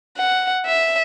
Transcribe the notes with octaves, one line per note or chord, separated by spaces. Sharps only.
F#5
E5